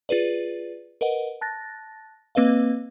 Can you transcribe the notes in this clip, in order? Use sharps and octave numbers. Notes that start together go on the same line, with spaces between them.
F4 G#4 B4 D5
A#4 B4 D#5 F#5
A5 F#6 A6 A#6
A#3 C4 B4 D#5 F5